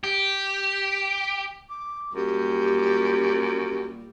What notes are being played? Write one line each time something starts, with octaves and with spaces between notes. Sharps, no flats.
G4
D6
F#2 A#2 G3 G4